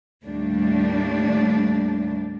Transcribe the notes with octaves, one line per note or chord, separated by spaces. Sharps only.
D#2 A2 G3 A3 A#3 D4